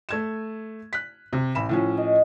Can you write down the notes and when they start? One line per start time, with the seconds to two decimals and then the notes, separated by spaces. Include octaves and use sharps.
0.09 A3 G#6 E7
0.93 F#6 B6
1.33 C3
1.55 A1 B5 E7
1.69 A2 F3 C#4
1.97 D#5